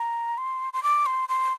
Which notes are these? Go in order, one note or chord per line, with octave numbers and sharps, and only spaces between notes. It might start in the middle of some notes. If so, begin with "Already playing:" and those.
Already playing: A#5
C6
C6
D6
C6
C6